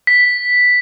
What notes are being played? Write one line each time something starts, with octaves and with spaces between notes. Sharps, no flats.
B6